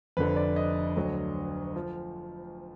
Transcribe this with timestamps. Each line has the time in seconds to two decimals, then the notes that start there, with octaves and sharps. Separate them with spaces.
0.17 F1 F2 D3 B4
0.36 D5
0.56 D#5
0.96 D2 D3 F#3
1.76 F3